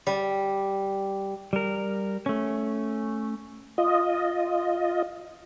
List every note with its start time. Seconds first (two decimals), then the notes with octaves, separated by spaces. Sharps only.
0.07 G3
1.53 G3 A#4
2.26 A3 C#4
3.78 F4 D#5